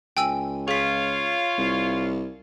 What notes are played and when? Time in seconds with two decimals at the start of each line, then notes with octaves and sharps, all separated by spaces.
0.17 C#2 G5 G#5 E6
0.68 F4 G#4 C#5 F5 B6
1.58 C2